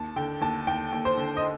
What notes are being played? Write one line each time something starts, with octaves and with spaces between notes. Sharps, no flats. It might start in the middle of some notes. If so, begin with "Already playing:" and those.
Already playing: D#2 A5
D3 G5
D#2 A5
D#2 G5
D#2
C5
D3
D#5